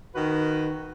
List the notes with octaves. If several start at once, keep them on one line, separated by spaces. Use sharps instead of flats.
D#3 F#4 B4